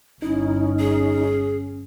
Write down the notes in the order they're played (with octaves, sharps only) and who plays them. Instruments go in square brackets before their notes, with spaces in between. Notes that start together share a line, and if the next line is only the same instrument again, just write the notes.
[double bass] G1 [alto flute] C#4 [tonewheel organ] D#4 [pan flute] E4
[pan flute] G#4